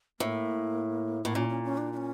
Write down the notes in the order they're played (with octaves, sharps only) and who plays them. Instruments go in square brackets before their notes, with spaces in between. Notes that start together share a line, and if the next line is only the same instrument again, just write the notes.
[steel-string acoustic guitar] A2 [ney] A#3
[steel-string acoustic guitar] A2 [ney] A#3
[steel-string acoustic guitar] A#2 [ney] C#4
[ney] C#4
C#4
D4
D4
C#4